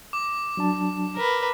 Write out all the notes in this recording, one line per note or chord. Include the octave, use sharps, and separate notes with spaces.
D6
F#3 D4 A5
A#4 B4